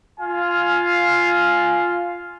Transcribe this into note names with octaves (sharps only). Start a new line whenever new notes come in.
F4 F5 G#5